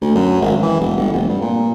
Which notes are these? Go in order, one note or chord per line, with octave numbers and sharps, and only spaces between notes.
D2
F#2
G#1
E3
E1
G1
F1
G2
A#2